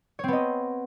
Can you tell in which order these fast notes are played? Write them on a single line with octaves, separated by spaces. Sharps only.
C#5 C4 B3 D#5